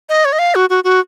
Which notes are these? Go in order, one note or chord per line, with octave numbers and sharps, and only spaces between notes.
D#5
C#5
D#5
F5
F#4
F#4
F#4